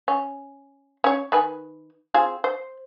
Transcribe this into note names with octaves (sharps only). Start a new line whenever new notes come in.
C#4
C#4 C#5
D#3 B4 G#5
C4 F4 G#4
C5